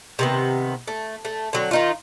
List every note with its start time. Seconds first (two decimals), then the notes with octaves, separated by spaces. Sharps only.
0.19 C3 D#3 B3
0.88 A3
1.25 A3
1.53 D3 F#3 C4
1.71 D#3 D#4 F4